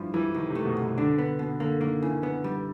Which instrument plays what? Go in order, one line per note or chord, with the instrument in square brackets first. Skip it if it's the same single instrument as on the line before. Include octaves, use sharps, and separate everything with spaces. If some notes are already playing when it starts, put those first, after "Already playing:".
Already playing: [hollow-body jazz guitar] G2 [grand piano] E3 F3
[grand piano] E3 [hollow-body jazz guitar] G3
[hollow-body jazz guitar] C2 [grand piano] D#3
[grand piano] C3
[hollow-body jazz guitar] A3
[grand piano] B2
[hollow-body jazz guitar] C2
[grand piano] B2
[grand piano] D3 [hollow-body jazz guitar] D4
[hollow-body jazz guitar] B3
B2
[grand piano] D3 [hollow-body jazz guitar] A#3
[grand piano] D#3 [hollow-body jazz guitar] A#3
[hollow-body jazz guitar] C#3 [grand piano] E3
[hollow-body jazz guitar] B3
G3